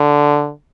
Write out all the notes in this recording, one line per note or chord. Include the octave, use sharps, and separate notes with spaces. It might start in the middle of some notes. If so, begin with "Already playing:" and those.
Already playing: D3